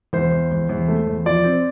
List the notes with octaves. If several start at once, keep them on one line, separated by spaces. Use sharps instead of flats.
E2 C5
E2
E2
E2
A3
E2
F3 D5
C4